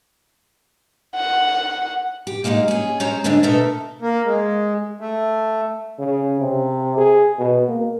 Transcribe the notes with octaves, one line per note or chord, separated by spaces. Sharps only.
F#5
G4
G#3 A#3 D#4 E4 F#4
C#4 G#4
G#3 C#4 C5 C#5 A#5
D#2 G#2 D3 F3 G#3 D4
B2 A3 A4 A#4 D#5 E5
A#3
G#3
A3
C#3
C3
G#4
B2
A#3